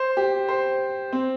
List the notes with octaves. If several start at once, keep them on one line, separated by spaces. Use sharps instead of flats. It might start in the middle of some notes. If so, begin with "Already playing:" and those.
Already playing: C5
G4
C5
C4